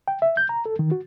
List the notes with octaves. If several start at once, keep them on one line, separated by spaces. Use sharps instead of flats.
G5
E5
G6
A#5
A4
D#3
F#4